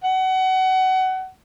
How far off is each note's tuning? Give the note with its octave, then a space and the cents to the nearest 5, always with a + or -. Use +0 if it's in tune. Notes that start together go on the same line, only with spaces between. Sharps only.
F#5 +25